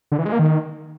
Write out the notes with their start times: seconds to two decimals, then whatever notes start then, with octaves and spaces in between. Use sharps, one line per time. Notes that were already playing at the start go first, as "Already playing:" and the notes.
0.12 D3
0.19 E3
0.25 G#3
0.32 A#3
0.39 D#3